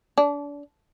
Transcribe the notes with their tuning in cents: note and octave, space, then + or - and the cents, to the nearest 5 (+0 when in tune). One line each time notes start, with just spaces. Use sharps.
D4 -30